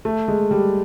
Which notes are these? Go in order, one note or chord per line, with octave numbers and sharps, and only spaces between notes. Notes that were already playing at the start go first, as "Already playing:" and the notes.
A3
G#3
G3